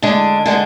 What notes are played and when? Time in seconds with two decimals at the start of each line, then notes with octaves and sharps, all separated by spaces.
0.02 D3 G#3 D4
0.46 D3 G#3 D4